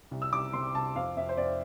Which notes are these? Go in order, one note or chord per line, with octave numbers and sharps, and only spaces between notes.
C2
E6
C2 D6
C3 C6
C2 A5
F2 F5
F2 E5
C5
F2 D5